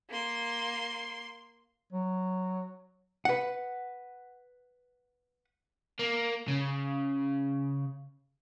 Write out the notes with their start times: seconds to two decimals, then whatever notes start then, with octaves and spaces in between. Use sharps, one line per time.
0.10 A#3 C6
1.93 F#3
3.25 B4 F#5
5.99 A#3
6.48 C#3